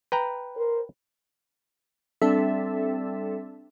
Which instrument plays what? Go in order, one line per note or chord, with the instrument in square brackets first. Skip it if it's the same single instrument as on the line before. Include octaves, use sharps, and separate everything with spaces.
[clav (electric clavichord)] B4 G5 A#5
[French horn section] A#4 C5
[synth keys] G3 C4 D4 A4 E5